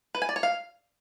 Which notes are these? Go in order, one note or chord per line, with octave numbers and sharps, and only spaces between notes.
B4
G#5
D5
C#5
F5